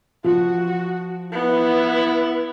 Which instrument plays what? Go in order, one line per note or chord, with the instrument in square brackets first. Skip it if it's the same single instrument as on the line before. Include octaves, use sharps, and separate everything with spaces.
[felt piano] F3 [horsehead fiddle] F#4
[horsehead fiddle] B3 [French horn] E4